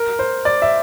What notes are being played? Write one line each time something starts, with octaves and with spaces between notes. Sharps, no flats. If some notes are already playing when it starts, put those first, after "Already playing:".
Already playing: A#4
C5
D5
E5